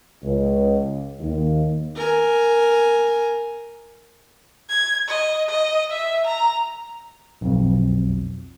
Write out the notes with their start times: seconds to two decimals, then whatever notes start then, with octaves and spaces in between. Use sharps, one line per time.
0.22 C#2
1.19 D#2
1.96 A#4 G#5
4.69 G#6
5.08 D#5
5.49 D#5
5.91 E5
6.27 A#5
7.41 B1 F2